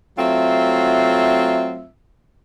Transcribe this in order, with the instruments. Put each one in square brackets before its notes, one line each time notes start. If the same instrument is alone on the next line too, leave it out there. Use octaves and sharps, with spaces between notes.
[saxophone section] F#3 A3 C4 F4 E5